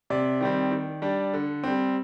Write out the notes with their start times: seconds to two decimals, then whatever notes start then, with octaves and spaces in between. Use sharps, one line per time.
0.10 C3 D5
0.40 D#3 G3 C4
0.71 D#3
1.02 G3 D4
1.34 D3
1.64 G3 C4